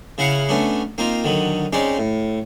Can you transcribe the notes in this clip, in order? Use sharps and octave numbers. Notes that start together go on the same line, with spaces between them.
C#3 E4 F5 F#5
A3 B3 C#4 D4
A#3 C4 D#4 F4
D3 D#3 F#3
G#3 C4 C#4 D#4 D5
A2